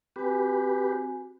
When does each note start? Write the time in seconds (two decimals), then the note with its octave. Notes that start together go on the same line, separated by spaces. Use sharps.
0.16 C4 F#4 G4 B4 G#5